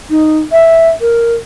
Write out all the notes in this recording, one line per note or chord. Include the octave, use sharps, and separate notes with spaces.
D#4
E5
A#4